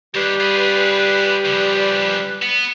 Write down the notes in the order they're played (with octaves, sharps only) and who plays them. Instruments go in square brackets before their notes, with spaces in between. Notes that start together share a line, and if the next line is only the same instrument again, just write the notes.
[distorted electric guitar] D#2 [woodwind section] G3 G4 B4
[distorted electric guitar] F4 G#4
C#3 F3
B3